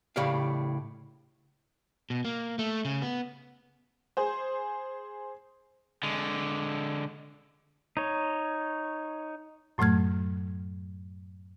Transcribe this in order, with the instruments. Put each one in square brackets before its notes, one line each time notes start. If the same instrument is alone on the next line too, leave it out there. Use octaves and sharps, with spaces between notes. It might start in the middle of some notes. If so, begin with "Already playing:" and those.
[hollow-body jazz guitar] A2 C#3 G4 D5 F5
[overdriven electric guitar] B2
A#3
A3
C#3
B3
[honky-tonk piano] G#4 C5
[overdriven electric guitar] D3 G#3
[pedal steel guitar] D#4 C#5
[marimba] F#2 A2 F#3 A3 F6 G#6